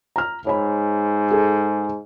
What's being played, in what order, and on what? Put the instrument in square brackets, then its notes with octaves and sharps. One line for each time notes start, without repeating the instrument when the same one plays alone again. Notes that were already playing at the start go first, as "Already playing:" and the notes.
[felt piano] A#5 F6
[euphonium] G#2 [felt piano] C#5 B5
[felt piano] G#4 A4